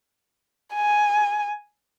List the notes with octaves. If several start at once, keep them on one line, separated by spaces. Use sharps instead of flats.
G#5